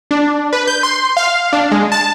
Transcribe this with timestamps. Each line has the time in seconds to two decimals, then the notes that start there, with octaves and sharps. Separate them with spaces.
0.11 D4
0.53 B4
0.67 G6
0.83 C6
1.17 F5
1.53 D4
1.71 G#3
1.92 A5